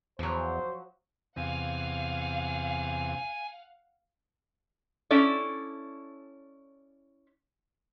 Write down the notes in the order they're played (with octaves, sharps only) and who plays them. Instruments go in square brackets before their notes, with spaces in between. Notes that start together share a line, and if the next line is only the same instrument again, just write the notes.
[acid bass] E2 [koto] F3 F#3 [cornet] C5
[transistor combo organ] E2 C3 [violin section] F5 F#5 [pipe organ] G#5
[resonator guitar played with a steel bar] C#4 E4 A4 D5